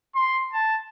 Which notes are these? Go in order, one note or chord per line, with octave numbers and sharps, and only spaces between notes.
C6
A5